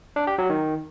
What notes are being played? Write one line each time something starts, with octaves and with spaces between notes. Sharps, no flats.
D4
G4
F#3
D#3